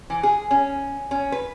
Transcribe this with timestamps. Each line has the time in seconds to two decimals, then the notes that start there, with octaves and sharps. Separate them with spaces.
0.10 E3
0.23 G#4
0.51 C#4
1.11 C#4
1.32 B4